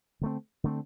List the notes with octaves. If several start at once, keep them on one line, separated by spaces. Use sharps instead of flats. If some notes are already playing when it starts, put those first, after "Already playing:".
D3 A3 C4
D3 A3 C4